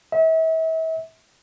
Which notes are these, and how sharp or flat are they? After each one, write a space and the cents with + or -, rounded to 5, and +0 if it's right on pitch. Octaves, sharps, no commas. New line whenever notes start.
E5 -40